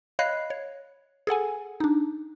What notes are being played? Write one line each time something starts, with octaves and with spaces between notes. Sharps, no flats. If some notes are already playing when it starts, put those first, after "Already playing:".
C#5 D#5 F5 B5 F#6 C7
C#5
G#4 A4 F#5 G#5
D4 D#4